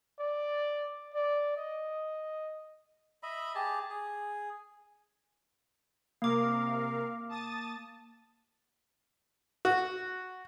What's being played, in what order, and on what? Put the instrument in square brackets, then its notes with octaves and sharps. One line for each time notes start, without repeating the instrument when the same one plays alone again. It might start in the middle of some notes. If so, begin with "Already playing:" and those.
[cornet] D5
D5
D#5
[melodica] D#5 E5 B5
G4 G#4 A5
G#4
[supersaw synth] C3 A#4 F5 [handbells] A#3 D6
[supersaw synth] A5 D#6 A6
[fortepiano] F#4